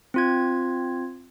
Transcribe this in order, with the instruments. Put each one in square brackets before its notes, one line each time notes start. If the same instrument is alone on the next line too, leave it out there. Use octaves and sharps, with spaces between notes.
[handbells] C4 F4 G#6